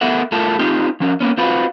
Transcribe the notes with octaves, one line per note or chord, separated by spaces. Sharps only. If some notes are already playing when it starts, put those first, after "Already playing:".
A3 B3 A4 A#4 E5 F#5
A2 A3 F4 A4 A#4 A5
C4 D#4 F4 G4
F3 C#4 A#4
A#3 B3 C#4
C4 F4 F#4 B4